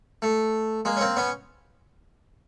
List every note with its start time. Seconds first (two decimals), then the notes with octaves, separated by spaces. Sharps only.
0.22 A3
0.85 G#3 A#3
0.97 C#4
1.01 A#3 C4
1.17 B3 C#4